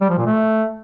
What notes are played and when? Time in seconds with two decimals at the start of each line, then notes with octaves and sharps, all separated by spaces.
0.01 G3
0.09 F3
0.18 A#2
0.26 A3